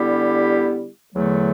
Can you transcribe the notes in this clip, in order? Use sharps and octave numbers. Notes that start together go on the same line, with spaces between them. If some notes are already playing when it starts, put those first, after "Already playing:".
Already playing: D3 G3 B3 E4 G4
E2 D3 F#3 A3